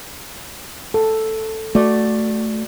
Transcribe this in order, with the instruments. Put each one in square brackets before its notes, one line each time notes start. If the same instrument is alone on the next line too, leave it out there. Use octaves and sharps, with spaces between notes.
[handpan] A4
[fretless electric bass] A3 [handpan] F#4 D5